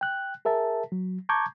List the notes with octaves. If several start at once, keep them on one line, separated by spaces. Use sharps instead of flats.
G5 F#6
G#4 A#4 E5 A5
F#3
A5 A#5 C#6 D6 G6 G#6